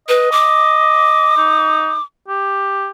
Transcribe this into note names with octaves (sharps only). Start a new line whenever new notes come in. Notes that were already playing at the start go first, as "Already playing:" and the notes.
B4 D#5
D6
D#4
G4